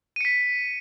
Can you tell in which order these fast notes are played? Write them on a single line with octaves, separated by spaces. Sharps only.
D#7 C#7 B6